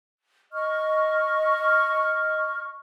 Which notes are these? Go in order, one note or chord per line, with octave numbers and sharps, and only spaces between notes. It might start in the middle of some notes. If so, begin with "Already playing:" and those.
D#5 C#6 F6